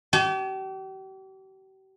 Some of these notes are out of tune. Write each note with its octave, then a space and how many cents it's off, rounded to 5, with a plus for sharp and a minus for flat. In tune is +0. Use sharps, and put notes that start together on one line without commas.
G4 -40 G#5 +45